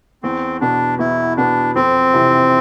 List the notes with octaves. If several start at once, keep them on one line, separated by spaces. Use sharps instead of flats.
E2 C4
B2 B3 D4
E2 E4
B2 B3 D4
F2 C4
C3 E3